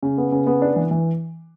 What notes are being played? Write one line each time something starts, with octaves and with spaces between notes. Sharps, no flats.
C#3
B3
C#3
B3
D4
E3
E3